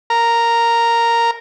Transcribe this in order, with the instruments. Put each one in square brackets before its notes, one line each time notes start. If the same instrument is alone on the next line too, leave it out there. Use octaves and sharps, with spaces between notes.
[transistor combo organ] A#4 A#5